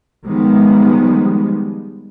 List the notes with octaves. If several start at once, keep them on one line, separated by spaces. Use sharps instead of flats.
D#3 F3 G3 G#3 B3